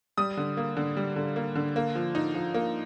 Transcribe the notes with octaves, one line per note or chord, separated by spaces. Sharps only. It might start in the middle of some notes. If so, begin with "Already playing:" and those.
G3 D#6
D3
A#3
D3
G3
D3
A#3
D3
A#3
F3
D#4
F3
A#3